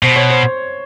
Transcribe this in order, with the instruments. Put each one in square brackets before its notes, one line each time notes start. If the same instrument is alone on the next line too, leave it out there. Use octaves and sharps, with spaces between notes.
[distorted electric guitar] B2 [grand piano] C5
[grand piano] C#5
C5